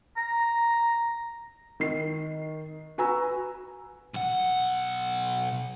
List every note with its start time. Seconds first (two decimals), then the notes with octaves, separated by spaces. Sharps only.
0.17 A#5
1.80 D#3 C7
2.98 F#4 B4 G#5 A#5 E6
4.14 B1 F#5